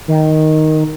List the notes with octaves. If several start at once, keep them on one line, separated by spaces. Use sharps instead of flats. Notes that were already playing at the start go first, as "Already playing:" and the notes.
D#3